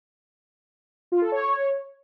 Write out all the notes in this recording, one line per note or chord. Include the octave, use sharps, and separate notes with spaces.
F4
A4
C#5